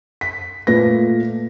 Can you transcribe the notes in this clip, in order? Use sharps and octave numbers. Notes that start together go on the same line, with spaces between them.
B6
A#2 A3 B4 A#6